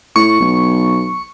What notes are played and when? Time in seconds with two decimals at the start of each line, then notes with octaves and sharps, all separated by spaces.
0.16 A2 C#6
0.41 B1